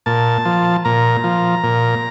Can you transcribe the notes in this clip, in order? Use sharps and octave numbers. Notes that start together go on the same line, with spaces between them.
A#2 A5
F3
A#2 A#5
F3
A#2